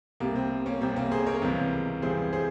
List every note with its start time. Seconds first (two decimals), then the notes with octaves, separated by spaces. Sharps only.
0.20 C2 C3 G3 A#3
0.36 C4
0.66 A#3 C#4
0.81 C2 C3 G3 C4
0.96 A#3 C#4
1.12 G#4 C5
1.26 A#4 C#5
1.42 C#2 C3 E3 G3
2.02 C#2 C3 E3 G3 G#4 C5
2.33 G#4 C5